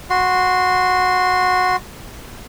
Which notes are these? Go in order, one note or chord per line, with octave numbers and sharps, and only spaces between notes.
F#4 C6